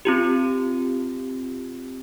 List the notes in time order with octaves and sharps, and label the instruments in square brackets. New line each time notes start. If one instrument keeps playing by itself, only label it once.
[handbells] C4 F4 G4